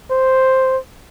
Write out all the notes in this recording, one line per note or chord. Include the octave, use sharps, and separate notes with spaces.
C5